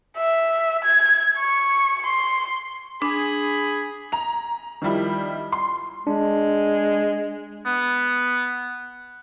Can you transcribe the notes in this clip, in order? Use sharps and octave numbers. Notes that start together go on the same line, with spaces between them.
E5
G#6
C#6
C6
D4 G#4 B5
A#5 F7
D#3 F3 G3 E4
C6
G#3 D4
B3